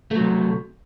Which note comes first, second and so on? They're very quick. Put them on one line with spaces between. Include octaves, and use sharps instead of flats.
A3 F#3 C3